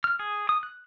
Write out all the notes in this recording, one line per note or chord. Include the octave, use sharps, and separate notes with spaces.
F6
G#4
D#6
F#6